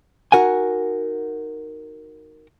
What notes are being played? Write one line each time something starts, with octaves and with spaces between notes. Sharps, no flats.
D#4 F#4 A#4 F#5 G#5